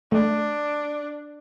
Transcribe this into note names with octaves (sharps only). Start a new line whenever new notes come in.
A3 D4